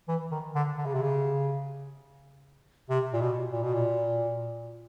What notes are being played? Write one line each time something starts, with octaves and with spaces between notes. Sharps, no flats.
E3
D#3
D3
D3
C#3
C3
C#3
C3
A#2
B2
A#2
B2
A#2